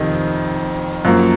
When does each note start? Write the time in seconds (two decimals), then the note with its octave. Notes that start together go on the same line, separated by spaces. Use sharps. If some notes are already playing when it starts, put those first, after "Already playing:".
Already playing: F2 C3 D#3
1.05 F#2 F3 A#3